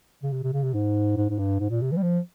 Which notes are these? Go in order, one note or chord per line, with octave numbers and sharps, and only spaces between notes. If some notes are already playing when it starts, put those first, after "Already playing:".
C#3
C3
C3
C#3
C3
G#2
G#2
G#2
G2
G#2
A#2
C3
E3
G3
F3